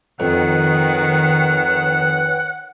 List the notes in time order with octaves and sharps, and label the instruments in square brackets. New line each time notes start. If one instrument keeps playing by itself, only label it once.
[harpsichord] F2 [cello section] D#3 [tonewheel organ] B4 C#5 G5 [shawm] F#5